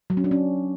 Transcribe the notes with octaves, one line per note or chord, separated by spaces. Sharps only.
F#3
C#4
D4
C#4